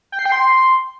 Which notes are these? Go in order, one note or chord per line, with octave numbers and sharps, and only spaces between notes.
G5
C7
G5
C6